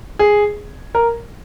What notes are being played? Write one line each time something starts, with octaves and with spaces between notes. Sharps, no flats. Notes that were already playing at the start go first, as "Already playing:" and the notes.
G#4
A#4